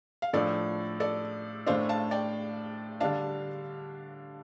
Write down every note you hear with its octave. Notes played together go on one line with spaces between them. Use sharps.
F5
A2 F3 D4 A4 D5
A4 D5
A2 A3 D4 C5 F5
F5 A5
D5 G5
D3 G3 D4 F5 A5